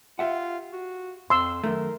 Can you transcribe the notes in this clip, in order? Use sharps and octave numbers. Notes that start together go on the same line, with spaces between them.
F4 G4 E5 F#5
F#4
F2 C6 E6
F#2 D#3 A3 A#4